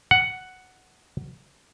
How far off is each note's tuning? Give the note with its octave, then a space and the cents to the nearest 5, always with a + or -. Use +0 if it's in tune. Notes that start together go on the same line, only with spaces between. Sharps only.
F#5 +5